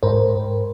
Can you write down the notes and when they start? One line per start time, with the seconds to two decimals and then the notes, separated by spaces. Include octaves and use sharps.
0.03 G#2 A#4 C5